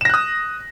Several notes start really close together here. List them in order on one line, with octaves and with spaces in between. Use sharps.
E7 A#6 F#6 D#6